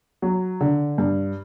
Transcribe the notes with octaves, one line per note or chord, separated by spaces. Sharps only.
F#3
D3
G2